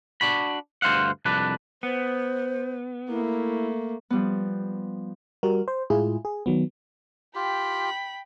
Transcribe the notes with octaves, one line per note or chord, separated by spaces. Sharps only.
D4 F#4 B5
D2 G2 C5 F5 F#5
C2 F2 D4 B4
B3 C5
A3 A#3 E4
F3 G3 B3
G3 F#4 A#4
C5
A2 G#3 E4 F4 G#4
G#4
D#3 F#3 B3
F4 G4 G5 B5